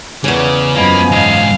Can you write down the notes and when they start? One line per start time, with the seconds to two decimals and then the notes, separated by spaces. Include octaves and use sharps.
0.24 E2 C#3 C#4 D5
0.76 F#2 F3 A#3 D#5 G#5 B5
1.11 E2 G#2 F5